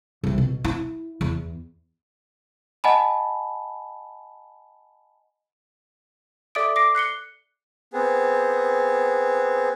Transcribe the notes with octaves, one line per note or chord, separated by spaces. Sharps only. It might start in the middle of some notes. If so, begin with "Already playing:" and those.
C2 C4
B2
E4
E2
D#5 F#5 G#5 A5 B5
A4 D5 E5 D6 D#6 D7
D6 A#6 C7 D7
F#6 C7 C#7 G7
B3 C4 G#4